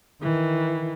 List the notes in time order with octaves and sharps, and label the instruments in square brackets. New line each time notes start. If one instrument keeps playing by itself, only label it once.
[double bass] D#3 [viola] E3